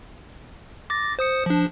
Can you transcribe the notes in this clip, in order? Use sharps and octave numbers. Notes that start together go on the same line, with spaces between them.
D6 A6 A#6
C5 D#6 C#7
F3 D4